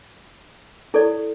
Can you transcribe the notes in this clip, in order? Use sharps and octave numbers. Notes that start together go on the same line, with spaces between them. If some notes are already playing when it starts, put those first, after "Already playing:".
E4 A4 D5